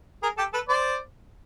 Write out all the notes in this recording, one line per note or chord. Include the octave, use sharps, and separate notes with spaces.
G#4 A#4
G4 A4
A4 B4
C5 D5